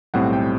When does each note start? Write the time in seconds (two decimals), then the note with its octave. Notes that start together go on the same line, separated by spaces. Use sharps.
0.14 B1 A2 G3 C4 F#5
0.33 G5